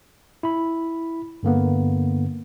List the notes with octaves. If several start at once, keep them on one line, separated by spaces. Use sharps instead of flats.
E4 B5
G2 D3 A#3 B3